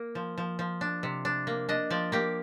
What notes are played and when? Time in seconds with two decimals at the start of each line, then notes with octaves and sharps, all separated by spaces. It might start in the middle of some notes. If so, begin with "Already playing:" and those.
Already playing: A#3
0.15 F3
0.38 F3
0.59 F3
0.81 D4
1.03 C3
1.25 D4
1.47 A#3
1.69 D4 D#5
1.90 F3 D5
2.12 A#3 G4